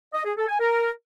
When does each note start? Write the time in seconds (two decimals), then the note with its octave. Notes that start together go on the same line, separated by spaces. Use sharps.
0.13 D#5
0.25 G#4
0.37 A4
0.48 G#5
0.60 A#4